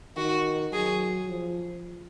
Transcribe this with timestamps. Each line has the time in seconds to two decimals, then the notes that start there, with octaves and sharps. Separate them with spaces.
0.17 D#3 F#4
0.72 F#3 G#4
1.28 F3